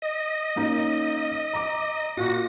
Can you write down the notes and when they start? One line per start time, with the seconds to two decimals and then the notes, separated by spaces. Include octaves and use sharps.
0.02 D#5
0.56 A#3 C#4 D#4
1.54 A#5 D6
2.17 A#2 F#4 A#6